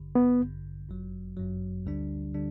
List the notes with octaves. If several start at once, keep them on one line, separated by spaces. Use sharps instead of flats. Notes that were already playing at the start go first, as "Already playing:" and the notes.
Already playing: A1 G2 D3
B3
A1 G2 D3
G1 F#2 F#3
G1 F#2 F#3
D2 D3 G3 D4
D3 G3 D4